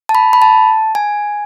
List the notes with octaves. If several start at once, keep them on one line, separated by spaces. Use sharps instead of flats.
A5
B5
B5
A5
G#5